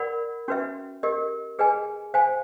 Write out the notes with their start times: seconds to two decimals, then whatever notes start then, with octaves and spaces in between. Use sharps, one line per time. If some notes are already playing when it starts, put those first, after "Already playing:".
Already playing: A#4 D5 F#5 B5
0.48 C#4 F#4 B4 E5
1.03 G4 A#4 D#5
1.59 G#4 B4 D#5 G#5
2.14 C5 F5 G#5